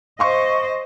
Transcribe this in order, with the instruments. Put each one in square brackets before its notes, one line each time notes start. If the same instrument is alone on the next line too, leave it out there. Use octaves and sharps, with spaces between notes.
[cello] C5 D#5 [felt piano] F5 C6 C#6